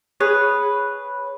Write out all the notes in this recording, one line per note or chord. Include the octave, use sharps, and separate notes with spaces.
G#4 B4 C#5